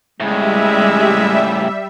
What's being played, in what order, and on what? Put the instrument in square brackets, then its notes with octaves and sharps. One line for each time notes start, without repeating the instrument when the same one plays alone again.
[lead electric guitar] A2 C#3 [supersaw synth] G3 E5 [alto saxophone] G#3